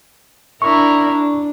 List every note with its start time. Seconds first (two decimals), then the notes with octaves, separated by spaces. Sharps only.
0.62 D4 E4 A#4 C#6
1.09 D4